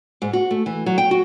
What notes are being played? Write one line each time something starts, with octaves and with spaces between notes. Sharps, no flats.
G#2
F#4
A3
E3
F#3
G5
F#4